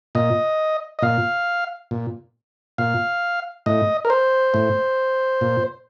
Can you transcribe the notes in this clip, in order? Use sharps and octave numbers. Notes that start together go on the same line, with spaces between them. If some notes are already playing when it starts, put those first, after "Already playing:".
A#2 D#5
D#5
A#2 F5
A#2
A#2 F5
A2 D#5
A#4
C5
A2
A#2